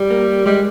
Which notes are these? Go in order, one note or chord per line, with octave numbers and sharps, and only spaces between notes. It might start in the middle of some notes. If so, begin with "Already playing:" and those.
Already playing: G3
A#3
G3 G#3